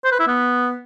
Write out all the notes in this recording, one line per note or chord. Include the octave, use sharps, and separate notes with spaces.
C5
B4
E4
B3